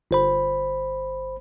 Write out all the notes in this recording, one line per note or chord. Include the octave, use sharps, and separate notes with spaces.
G1 C5 B5